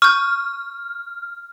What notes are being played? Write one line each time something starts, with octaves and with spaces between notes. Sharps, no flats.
C#6 F6 G6